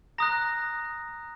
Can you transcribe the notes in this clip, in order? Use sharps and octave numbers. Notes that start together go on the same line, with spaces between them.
A#5 D#6 F#6 A#6